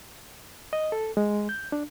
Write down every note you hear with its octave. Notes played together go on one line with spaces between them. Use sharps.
D#5
A4
G#3
G6
D4